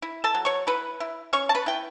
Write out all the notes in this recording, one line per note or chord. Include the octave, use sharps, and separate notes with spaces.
E4
A4 A5
F#3
C#5 C#6
E4 B4 B5
E4
C#4 C#5 C#6
A5
B4 B5
E4 G5